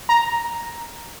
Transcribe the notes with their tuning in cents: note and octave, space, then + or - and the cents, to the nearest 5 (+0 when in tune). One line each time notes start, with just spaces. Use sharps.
A#5 +0